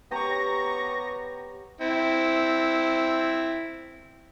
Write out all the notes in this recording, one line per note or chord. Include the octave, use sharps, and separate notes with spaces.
B3 G4 C#5 A#5 C#6 A#6
C4 E4